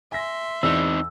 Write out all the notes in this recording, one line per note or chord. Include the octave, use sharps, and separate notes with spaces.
E5 G#5 C6 A#6
E2 C4 D#4 D5 E6